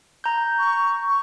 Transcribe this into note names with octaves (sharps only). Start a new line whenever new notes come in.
A#5 G6
C#6
C#6